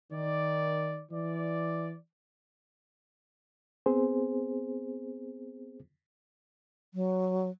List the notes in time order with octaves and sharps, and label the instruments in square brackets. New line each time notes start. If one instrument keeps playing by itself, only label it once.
[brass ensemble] D#3 D5
E3 D5
[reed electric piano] B3 C4 G#4 C5
[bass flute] F#3